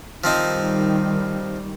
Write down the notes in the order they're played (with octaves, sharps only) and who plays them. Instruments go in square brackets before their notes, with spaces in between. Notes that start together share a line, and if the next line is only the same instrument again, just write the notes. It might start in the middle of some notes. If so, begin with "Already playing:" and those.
[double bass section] D#3 G3 [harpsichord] F3 C4 D#4